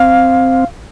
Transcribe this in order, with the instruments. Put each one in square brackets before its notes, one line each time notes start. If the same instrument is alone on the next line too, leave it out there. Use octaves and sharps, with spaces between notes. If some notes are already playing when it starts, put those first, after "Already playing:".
Already playing: [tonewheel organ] C4 [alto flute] F5